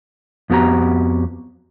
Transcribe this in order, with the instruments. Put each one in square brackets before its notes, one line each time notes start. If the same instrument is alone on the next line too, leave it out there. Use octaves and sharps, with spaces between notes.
[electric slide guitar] F2 B3 F#4 G4 A#5